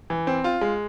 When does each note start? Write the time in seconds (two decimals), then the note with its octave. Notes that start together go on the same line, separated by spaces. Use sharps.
0.10 E3
0.27 C4
0.44 F4
0.61 G#3